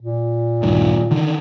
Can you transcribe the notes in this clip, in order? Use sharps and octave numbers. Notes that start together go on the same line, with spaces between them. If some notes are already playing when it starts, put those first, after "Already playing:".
A#2
D1 G2 D#3
D3 D#3